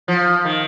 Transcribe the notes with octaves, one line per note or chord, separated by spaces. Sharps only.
F3
D#3